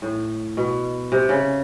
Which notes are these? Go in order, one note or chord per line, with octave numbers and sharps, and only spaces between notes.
A2
B2
C3
C#3